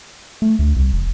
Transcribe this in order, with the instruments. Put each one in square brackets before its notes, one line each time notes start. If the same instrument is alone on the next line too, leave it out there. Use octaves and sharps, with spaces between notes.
[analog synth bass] A3
D2
C2
F1